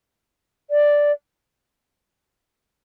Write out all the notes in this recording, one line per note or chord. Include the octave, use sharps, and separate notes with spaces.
D5